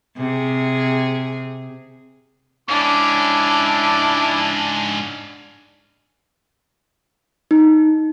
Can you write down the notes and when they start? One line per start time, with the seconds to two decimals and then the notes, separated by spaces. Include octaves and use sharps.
0.18 C3 G#4
2.69 G#2 C#4 D4 E4 D6
7.51 D#4